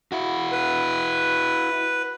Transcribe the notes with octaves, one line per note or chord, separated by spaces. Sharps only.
E4 F#4
B4